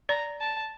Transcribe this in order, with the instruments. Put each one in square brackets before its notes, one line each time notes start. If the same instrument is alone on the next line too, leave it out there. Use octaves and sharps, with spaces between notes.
[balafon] D5 [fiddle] A#5
[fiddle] A5